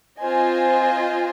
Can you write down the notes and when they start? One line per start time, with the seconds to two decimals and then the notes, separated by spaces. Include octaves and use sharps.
0.21 C4 F4 C5 D#5 G#5